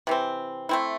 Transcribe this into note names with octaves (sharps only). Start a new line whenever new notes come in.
C3 E3 C4
A3 C4 E4